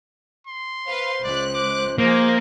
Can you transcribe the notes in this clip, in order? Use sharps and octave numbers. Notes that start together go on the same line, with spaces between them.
C6
B4 C5 F5
C#2 D5 F#6
D6
F3 A#3 D#4 G#4 C5